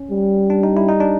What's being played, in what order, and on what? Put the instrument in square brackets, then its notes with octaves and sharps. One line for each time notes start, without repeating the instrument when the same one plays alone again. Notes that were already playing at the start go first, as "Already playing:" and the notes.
Already playing: [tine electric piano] C#4
[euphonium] G3
[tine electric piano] D4
D#4
E4
D#4
D4